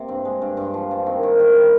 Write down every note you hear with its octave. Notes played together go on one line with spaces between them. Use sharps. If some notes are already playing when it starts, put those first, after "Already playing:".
Already playing: C3 A#3
G2 C4
G#3
G2
G2
F3
G2
D#3 C4
D#3
D#3
G3